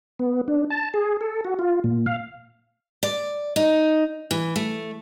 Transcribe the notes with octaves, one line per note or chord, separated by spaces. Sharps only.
B3
D4
A5
G#4
A4
F#4
F4
A#2
F5
D5
D#4
E3
A3